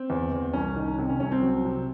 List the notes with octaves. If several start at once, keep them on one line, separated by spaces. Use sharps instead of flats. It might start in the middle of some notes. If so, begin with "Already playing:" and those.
Already playing: C4
E2
E2
C2 C#4
D#3
C3
C#4
C2 C#4
C4
F#3
C3